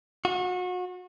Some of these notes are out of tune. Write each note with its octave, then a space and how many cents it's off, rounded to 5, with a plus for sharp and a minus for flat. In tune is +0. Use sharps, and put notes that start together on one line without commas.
F#4 -35